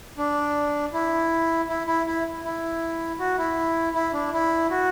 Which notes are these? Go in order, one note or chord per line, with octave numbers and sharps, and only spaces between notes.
D4
E4
E4
E4
E4
E4
F#4
E4
E4
D4
E4
F#4